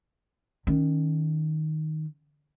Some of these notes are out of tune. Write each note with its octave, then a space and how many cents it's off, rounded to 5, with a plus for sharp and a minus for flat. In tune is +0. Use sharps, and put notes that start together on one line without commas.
D#3 +0 C#4 +0